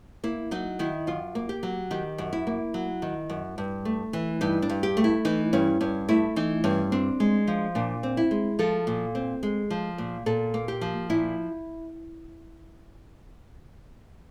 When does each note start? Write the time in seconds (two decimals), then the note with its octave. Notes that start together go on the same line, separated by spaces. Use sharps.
0.23 A#3 E4
0.51 F#3 D#4
0.79 D#3 E4
1.07 F#2 F4
1.35 A#3
1.49 G4
1.63 F#3
1.91 D#3 G4
2.18 F#2
2.33 E4
2.47 A#3
2.74 F#3
3.02 D#3
3.30 F#2
3.58 G2
3.85 A3
4.13 E3
4.41 G2 D#4
4.62 D4
4.69 G2
4.83 G4
4.97 A3
5.04 E4
5.25 E3 D#4
5.53 G2 C#4
5.81 G2 C#4
6.09 A3 E4
6.36 E3 D#4
6.64 G2 C#4
6.92 C4 D4
7.20 G#3
7.47 F3
7.75 A#2 D4
8.03 C4
8.17 E4
8.31 G#3
8.59 F3 A4
8.87 A#2
9.15 C4
9.43 G#3
9.70 F3
9.98 A#2
10.26 A#2 A4
10.54 A#3
10.68 G4
10.81 F3
11.10 A#2 E4